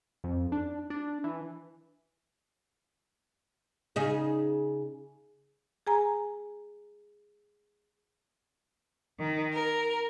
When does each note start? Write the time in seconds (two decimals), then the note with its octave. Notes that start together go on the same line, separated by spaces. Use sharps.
0.24 F2
0.52 D4
0.90 D4
1.24 E3
3.96 C#3 D#4 G#4
5.87 G#4 G#5 A#5
9.16 D#3
9.53 A#4